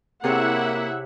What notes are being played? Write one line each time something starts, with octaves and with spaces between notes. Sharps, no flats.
C3 A#3 E4 G#4 C#5 E5 F#5